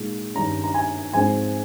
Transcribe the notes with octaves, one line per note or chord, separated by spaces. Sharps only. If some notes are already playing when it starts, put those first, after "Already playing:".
Already playing: A#2 G#3 D#4
G2 D#3 G3 C#4 A#5
A#5
G#5
G#2 F3 G#3 C4 D#4 G#5